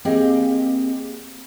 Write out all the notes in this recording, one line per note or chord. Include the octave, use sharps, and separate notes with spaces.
A#3 C4 G4 G#4 D#5 G5